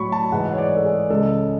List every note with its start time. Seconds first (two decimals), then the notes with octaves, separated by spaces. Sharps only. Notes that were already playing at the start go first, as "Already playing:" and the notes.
Already playing: A2 F#3 B5 C#6
0.12 A5
0.32 G#2 E3 G#3 F#5
0.52 C#5
0.58 D5
0.77 A4
0.85 G#4
1.10 C#2 C#3 G#3 A4